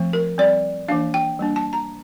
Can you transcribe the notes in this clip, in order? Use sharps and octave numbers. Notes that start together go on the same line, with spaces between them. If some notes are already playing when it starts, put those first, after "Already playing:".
Already playing: F3 A3 C4
A#4
G3 C4 D5
E3 A#3 D4 F5
G5
G3 A#3 D4
A5
A#5